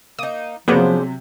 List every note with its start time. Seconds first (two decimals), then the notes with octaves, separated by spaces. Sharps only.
0.19 A#3 D#4 D#6
0.68 C3 F3 F#3 G#3 A#3 B3 D4 C5